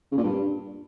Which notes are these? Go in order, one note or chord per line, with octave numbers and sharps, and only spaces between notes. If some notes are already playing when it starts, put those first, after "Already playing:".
C#3
A#2
G2